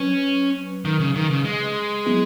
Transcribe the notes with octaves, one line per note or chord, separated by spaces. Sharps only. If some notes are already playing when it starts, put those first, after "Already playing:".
Already playing: F#3 C#4 B4
D#3
C#3
D#3
C#3
G#3
F#3 B3 E4 G#4